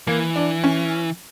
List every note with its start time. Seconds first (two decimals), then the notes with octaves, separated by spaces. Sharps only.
0.07 E3 A#3
0.36 D4
0.64 C#4